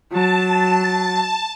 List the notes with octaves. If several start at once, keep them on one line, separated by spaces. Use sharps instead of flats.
F#3 A5